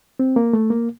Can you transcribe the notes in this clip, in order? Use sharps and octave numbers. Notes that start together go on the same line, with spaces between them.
C4
A#3
A3
A#3